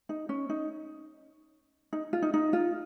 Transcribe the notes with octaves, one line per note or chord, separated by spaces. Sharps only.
D#4
C#4
D#4
D#4
F4
D#4
D#4
F4